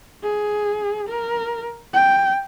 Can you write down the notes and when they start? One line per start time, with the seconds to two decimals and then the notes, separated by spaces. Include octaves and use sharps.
0.23 G#4
1.09 A#4
1.93 G5